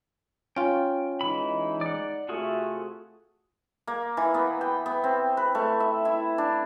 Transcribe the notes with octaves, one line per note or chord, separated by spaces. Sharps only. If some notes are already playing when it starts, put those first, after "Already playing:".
C#4 F4 G5
E3 G#3 D#4 E4 B5
D5 F#5
C3 A3 F4 F#4 G#4
A#3
E3
B3
G5
B3
C4
B4
A3
E5
E4
D4